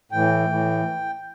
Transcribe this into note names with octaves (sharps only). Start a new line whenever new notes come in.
A2 E3 G5
A2 E3